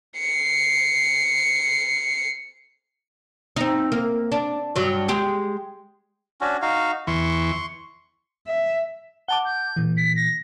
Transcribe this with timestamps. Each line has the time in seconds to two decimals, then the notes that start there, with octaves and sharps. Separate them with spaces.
0.19 C7 C#7
3.56 C4 D#4
3.92 A#3
4.32 D4
4.76 G2 F#3
5.08 G#3 G4 G#4
6.41 C#4 D4 F#4
6.62 D#4 F#4 F5
7.07 E2 E3 C6 C#6
8.48 E5
9.28 F#5 A5 D6 G7
9.45 G6
9.76 A#2 E3
9.97 B6
10.16 A#6